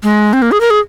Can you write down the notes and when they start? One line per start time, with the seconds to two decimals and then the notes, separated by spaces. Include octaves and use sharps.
0.03 G#3
0.33 C4
0.42 A#3
0.52 G#4
0.61 A#4
0.70 G#4